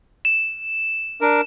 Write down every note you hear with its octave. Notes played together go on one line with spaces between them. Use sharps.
E7
D4 A#4